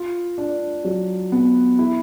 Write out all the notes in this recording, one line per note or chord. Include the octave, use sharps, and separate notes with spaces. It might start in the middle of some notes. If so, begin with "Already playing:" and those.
Already playing: F4
D4
F#3
B3
E4